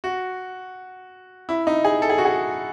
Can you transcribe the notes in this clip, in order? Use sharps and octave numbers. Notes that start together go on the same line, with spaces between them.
F#4
E4
D#4
G#4
A4
G#4
F#4
G#4